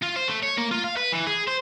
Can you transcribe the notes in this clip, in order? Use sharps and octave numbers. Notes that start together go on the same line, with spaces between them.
F4
C5
A3
C#5
A#3
F4
F5
B4
E3
G#4
C5